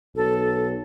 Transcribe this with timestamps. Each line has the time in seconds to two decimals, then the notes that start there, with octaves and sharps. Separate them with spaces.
0.16 B1 A4